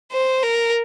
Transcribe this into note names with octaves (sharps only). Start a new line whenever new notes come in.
C5
A#4